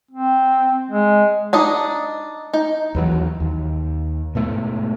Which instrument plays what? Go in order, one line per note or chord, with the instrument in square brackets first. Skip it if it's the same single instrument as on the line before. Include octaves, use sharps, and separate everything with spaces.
[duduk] C4
G#3
[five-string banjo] D4 D#4 D#5
D#4
[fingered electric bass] D#2 E3 F#3
D#2
G#2 B2 A3